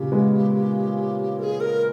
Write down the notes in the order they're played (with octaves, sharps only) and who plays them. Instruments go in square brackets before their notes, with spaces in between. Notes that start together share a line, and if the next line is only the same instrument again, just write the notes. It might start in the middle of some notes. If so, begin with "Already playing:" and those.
Already playing: [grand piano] A#2 C#3 [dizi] G4
[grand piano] G#3 B3
[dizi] A#4
G#4
A#4